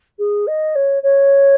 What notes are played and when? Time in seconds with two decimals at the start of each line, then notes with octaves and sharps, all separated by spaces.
0.18 G#4
0.47 D#5
0.75 C#5
1.02 C#5